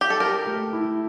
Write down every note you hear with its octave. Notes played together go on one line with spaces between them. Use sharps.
G4
A4
G4 A#4
A3
E4